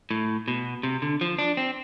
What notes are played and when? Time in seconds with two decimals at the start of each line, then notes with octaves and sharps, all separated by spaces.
0.11 A2
0.48 B2
0.83 C3
1.02 D3
1.21 F3
1.39 D4
1.57 C4